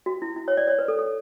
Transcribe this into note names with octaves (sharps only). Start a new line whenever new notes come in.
F#4
E4
E4
C#5
D5
C#5
B4
A4
A4